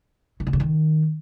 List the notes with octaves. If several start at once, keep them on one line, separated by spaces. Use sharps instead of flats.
D#3
D3
C#3
D#3